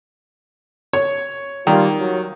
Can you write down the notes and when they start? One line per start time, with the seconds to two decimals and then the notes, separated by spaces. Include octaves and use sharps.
0.93 C#5
1.67 D#3 G3 A#3 F4
1.99 F#3